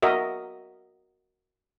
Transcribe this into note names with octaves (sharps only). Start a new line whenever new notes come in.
F#4 A#4 D#5 E5